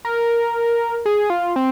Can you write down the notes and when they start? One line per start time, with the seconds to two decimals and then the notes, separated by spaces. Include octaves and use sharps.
0.05 A#4
1.06 G#4
1.30 F4
1.56 C4